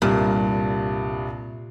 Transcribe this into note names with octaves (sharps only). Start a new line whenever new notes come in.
C2 G2 A#2